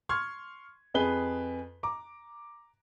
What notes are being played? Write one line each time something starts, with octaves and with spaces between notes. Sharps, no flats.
C6 C#6 F6 G#6
F2 G#4 B4 G7
A#5 D6